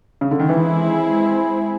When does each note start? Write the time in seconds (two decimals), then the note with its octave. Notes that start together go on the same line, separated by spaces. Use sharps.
0.21 C#3
0.31 D3
0.39 D#3
0.49 E3 G#3 C4 E4 G#4